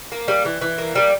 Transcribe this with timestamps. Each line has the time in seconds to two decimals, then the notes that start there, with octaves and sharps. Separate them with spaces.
0.12 A#3
0.28 G3
0.45 E3
0.61 E3
0.78 A#3
0.95 G3